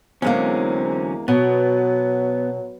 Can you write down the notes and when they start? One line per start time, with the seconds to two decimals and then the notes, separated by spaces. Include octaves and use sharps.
0.22 E2 D3 F#3 G#3 A#3 C4 C#4
1.28 B2 F#3 B3